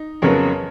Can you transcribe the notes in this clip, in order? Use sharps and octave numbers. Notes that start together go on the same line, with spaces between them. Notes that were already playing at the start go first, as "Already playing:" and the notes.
Already playing: D#4
F2 C#3 F#3 B3 A#4 C#5